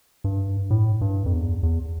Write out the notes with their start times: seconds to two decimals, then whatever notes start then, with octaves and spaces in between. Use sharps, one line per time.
0.24 G2
0.70 A2
1.01 G2
1.26 F2
1.33 E2
1.63 E2